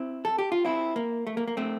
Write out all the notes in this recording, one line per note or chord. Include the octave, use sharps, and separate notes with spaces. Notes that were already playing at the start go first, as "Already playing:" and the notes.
Already playing: C4 E4
A4
G4
F4
C4 E4
A#3
A3
A#3
A#3
A3 C4